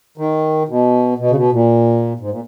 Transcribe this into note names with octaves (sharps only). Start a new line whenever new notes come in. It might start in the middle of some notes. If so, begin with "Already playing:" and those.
D#3
B2
B2
C#3
B2
A#2
G#2
A#2